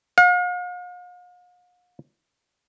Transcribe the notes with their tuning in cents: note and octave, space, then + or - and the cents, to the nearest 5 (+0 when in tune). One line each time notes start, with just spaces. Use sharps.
F5 +45